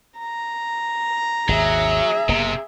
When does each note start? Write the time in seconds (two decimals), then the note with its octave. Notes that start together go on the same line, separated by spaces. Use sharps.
0.18 A#5
1.48 G#1 D#2 B2 F#3 G#4 E5
2.29 F#1 C3 A#3 B3